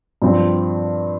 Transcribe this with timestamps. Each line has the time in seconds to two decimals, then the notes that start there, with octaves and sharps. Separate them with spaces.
0.22 G2 F3 C4